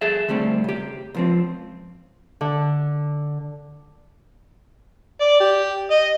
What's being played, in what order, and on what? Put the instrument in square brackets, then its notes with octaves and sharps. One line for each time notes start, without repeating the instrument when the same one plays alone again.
[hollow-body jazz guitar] G#4 A4 E5
D3 G3 A3 C4
C#3 G4
C#2 F3 C4
[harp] D3
[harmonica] D5
G4
D#5